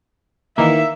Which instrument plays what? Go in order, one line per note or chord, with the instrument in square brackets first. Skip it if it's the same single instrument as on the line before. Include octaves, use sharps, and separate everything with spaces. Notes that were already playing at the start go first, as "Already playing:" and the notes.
[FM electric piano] D#3 E3 A#3 [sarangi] E5